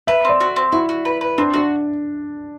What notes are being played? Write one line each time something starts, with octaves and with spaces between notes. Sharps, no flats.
B4 E5
C4 D5
F#4
C4
E4 F#4
F#4
B4
B4
C4 D4
D4 F#4